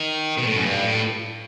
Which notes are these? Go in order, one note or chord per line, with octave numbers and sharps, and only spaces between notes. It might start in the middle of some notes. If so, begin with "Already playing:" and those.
Already playing: D#3
B2
A2
F#2
G2
A2